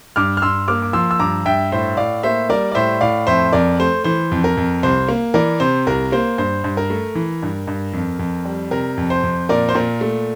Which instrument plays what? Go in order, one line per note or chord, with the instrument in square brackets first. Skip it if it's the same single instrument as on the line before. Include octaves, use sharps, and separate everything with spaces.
[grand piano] G2 D6 F6
F6
G2 C6 E6
A#3 D6 F6
D6
F3 C6 E6
E6
G2 A#5 D6
G2 E5 G5
A2 C5 E5
A2 D5 F5
A#3 C5 E5
G3 A#4 D5
D5
A2 C5 E5
A2 D5 F5
F2 C5 E5
F2 A#4 D5
A3 C5
E3 C5
F2
A#4
F2
C2 C5
A#3
E3 A#4 D5
C3 C5
C2 A#4
A#3 C5
G2 C5
G2
A#4
A3
E3
G2
G2
F2
F2
G3
C3 A#4
F2
C5
F2
A#2 A#4 D5
C5
A#2 A#4
A3